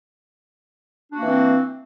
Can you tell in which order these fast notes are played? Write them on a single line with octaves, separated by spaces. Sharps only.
D4 F#4 A#3 E3 C4